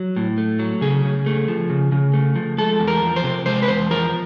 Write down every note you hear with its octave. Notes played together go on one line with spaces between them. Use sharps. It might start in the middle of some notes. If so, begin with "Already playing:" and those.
Already playing: F#3
A2
A3
F#3
C#3 G#4
C#3
A3
F3
C#3
C#3
A3
F3
G#3 A4
E2
A#4
F3
C5
C3
G#3 C5
B4
E2 C5
F3 A#4